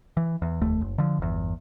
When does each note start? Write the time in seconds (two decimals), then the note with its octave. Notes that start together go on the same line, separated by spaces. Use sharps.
0.17 E3
0.42 E2
0.62 F1 D#2 A3
0.81 F#1
0.98 D3 F3
1.18 G1 E2